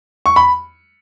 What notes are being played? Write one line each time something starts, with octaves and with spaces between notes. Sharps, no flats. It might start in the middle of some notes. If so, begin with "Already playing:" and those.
C#6
B5